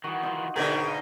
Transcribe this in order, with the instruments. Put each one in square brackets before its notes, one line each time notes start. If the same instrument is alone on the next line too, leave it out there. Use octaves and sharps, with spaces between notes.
[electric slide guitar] D#3 E3 [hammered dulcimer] F#4 D#5
[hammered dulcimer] D#4 F4 F#4
[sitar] G#2 B2 D3 [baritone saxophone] D#3 [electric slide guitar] G#4 D5 [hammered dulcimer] E5 A#5
[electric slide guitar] D#4 [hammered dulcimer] F5